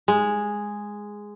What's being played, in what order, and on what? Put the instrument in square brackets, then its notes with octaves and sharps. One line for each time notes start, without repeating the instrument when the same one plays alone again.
[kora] G#3